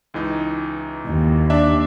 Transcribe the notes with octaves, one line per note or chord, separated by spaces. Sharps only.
C#2 E3 D#4
D#2
D4 D5 E5